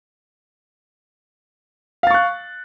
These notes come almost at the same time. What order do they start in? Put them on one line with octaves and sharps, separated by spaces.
F5 A6 C#6 F#6